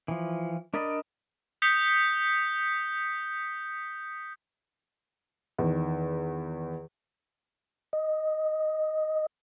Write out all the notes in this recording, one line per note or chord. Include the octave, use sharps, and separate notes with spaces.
E3 F3
D4 A#4 D5 D#5 B5
D#6 G6 B6 C#7 G7
E2 D#3
D#5